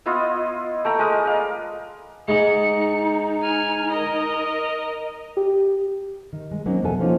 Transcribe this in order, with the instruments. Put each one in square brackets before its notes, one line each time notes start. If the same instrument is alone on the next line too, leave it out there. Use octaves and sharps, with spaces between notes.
[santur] B3 E4 F4 D#5
A3 G5 A#5
G#3 A#4 B4 D#6
D5 F5
[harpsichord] G#2 G#3 [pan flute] D#4 [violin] C#7
[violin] G#5 F6
A#4 D#5
[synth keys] G4
[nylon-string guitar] D#3
G#3
F#3 A#3 C4 C#4 D#4
E2 B2 A#3 B3 A4 G#5
F3 G3 A#3 C#4 D#4 F4